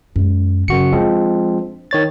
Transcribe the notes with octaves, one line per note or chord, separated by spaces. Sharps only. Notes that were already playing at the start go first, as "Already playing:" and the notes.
F#2 G#3
F#2 C#3 F#4 C#7
F3 G#3 C4 D4
D#3 C#5 A6